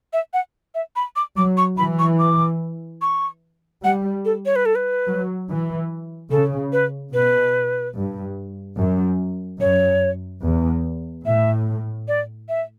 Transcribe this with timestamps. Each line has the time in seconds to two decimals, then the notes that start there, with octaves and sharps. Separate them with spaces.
0.13 E5
0.34 F#5
0.75 E5
0.96 B5
1.16 D6
1.37 F#3 D6
1.57 C#6
1.78 E3 B5
1.99 C#6
2.19 D6
3.02 C#6
3.84 G3 F#5
4.25 A4
4.46 C#5
4.56 B4
4.66 A4
4.75 B4
5.08 F#3
5.49 E3
6.31 C#3 A4
6.73 B4
7.14 B2 B4
7.96 G2
8.78 F#2
9.61 F#2 C#5
10.43 E2
11.26 A2 E5
12.08 D5
12.49 E5